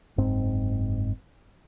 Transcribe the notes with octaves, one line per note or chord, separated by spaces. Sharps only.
F#1 G#2 C4